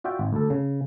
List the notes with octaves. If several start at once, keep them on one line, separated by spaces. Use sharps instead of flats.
F4 F#4 D5 E5 G5
G#1
D2 A4
C#3